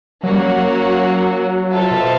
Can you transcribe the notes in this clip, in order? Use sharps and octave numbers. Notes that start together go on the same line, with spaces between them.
F#3 A#3 C#4 F#4 A#4
G3
F#3
F4 A4 C5 E5 A5
B2